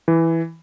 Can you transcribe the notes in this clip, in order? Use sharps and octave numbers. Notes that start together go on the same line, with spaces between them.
E3